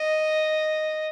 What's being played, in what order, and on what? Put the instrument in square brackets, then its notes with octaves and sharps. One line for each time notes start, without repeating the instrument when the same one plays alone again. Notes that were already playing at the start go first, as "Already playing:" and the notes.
Already playing: [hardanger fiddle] D#5